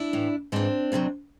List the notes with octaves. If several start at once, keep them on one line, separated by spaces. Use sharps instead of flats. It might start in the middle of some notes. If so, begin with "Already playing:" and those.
Already playing: D4 E4
A2 E3
G#2 E3 C4 D4
D2 C3 D#3 F#3